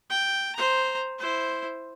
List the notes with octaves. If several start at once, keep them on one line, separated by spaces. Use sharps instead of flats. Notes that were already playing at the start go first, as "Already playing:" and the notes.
G5
C5 A#5
E4 C5